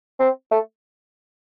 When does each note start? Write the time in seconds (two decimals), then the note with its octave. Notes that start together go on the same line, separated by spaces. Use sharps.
0.20 C4
0.51 A3